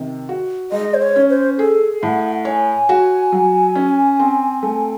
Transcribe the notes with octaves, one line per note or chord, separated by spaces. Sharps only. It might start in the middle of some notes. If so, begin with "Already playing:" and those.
Already playing: C3 D#3
F#4
G#3 D#5
C5
C#5
C#4
C5
G#4 A4
A2 F#5
C#5 G#5
F#4
F#3
C#4
C4
A3